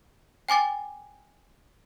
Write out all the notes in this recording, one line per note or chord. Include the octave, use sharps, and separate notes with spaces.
G5 G#5 D6 A6